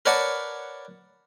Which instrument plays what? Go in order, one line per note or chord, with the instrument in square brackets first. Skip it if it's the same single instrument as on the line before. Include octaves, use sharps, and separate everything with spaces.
[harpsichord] A#4 B4 C#5 D5 F#5 A5